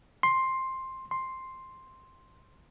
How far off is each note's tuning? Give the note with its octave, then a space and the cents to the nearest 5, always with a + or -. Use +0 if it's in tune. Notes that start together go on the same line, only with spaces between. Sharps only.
C6 +10
C6 +5